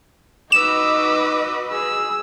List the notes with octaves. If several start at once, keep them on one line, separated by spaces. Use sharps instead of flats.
D#4 F#4 B4 D#5 D6 E6 E7
G#4 E6